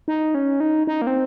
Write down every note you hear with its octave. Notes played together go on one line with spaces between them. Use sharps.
D#4
C#4
D#4
D#4
A#3
C4